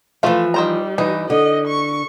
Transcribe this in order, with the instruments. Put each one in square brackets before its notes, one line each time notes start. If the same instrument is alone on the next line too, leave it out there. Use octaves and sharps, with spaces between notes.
[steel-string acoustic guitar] E3 F3 [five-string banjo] A3 F4 F5
[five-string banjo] D#3 C5 A#5 [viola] G3
[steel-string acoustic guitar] G2 E3 [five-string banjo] D#4
[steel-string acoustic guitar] D3 [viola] D#5
[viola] C#6